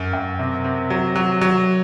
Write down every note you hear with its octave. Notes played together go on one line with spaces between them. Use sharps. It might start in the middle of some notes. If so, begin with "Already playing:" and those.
Already playing: F#2
F#2
C3
C3
F#3
F#3
F#3